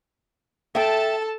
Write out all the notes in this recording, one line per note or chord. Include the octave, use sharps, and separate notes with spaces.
A4 E5 G5 A5